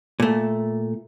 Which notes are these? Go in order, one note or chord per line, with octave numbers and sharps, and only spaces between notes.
A#2 A3